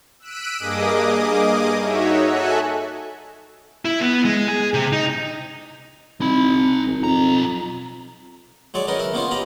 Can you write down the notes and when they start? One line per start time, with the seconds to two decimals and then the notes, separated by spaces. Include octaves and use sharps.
0.20 E6 F#6 B6 D7 D#7
0.59 G2 A#3 G#4 D#5 D6 D#6
1.81 D#4 F#4 C#5 E5
2.26 F#4 A4 E5 G#5 F#6
3.85 E4
4.01 B3
4.25 G#3
4.48 G#4
4.74 C3
4.93 D#4
6.21 C2 D#4 B5
6.86 G#1
7.04 B1 F2 A#5
8.74 F#3 G#3 C#5 D5
8.87 C#4 D#4 A#4 B4 D#5
8.99 A#4 E5
9.14 A#3 B3 C#4 D#4 F4
9.31 G4 D#5 A#5 B5